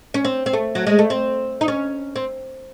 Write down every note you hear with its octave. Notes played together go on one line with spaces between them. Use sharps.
C#4
C4
C4
A3
F#3
G#3
A3
C4
D#4
C#4
C4